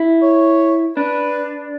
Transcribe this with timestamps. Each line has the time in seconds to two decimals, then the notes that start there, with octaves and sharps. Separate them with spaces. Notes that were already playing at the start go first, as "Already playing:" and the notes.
Already playing: E4
0.22 C#5
0.97 D4 B4